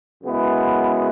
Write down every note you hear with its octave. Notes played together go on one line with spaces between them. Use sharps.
F#2 C#3 G#3 B3 E4